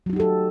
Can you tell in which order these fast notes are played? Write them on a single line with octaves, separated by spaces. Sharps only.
F#3 F#4 D#4 G4 A4